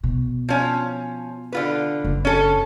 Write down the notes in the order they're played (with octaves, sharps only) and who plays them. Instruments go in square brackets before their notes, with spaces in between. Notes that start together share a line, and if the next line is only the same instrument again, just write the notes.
[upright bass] B2
[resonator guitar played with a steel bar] F3 C#4
D3 F4 B4
[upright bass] F#1
[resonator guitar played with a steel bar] C#4 A4